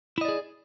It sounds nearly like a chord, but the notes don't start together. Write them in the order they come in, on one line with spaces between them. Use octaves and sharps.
E4 D#5 D5 G#4